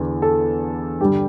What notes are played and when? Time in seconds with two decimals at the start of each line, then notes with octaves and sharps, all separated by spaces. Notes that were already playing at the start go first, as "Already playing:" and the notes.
Already playing: E2 D3
0.22 A4
1.00 G2 D3 G3 G4